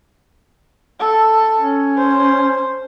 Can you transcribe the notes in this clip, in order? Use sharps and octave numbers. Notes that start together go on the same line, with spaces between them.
A4
C#4
C5